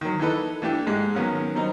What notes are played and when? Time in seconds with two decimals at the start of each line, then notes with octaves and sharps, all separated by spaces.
0.01 D#3 F#3
0.20 E3 D#4 A4 B4
0.62 E3 A3 D4 G4
0.87 G#2 G#3
1.15 D#3 F#3 B3 C#4 A#4
1.55 F#3 G3 C4 D#4